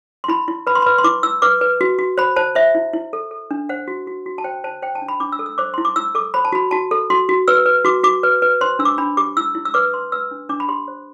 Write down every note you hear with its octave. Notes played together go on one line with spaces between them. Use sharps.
C6
E4 B5
E4
B4 B5
C6
B4 B5
C6
E4 D6
E4 E6
B4 D6
B4
F#4
F#4
C5 B5
C5 A5
C5 E5
E4
E4
A4
A4
D4
C5 F#5
F#4
F#4
F#4
A5
C5 G5
C5 A5
C5 G5
A5
D4
B5
D4 D6
E6
A4
E6
C5 D6
E4 C6
D6
E4 E6
A4 D6
C5 B5
A5
F#4 B5
F#4 A5
A4
F#4 C6
F#4
B4 E6
B4
F#4 D6
F#4 D6
B4
B4
C5 C6
D4 E6
D6
D4 B5
G4 D6
E4 E6
E4
E6
B4 D6
B4 C6
B4 E6
D4
D4 D6
B5
G4 C6
C5